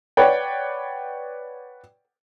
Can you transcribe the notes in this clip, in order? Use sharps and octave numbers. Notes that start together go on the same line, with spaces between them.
B4 C#5 D5 F#5 G5